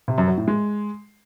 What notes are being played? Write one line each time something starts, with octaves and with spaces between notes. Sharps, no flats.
C3
F#2
F#3
A2
G#3